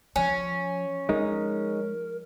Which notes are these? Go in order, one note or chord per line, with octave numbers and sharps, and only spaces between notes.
F3 C#4
F3 G#3 D#4 A#4